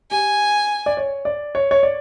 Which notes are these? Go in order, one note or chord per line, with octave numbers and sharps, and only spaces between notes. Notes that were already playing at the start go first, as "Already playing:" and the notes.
G4 G#5
D5
C#5
D5
C#5
C#5
D5